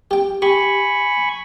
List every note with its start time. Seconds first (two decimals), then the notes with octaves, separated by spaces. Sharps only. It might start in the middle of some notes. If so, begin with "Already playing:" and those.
0.11 G4 G5
0.42 G4 G#5 B5 C#6